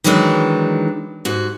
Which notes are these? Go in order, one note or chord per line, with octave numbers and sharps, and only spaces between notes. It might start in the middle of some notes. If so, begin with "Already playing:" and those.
D#3 E3 F#3 G#3 D4 D#4
G#2 F#4